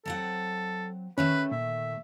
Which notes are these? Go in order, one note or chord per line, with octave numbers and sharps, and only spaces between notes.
F#3 C4 A4 F#5
D#3 A3 C#4 A4 B4
A#2 E5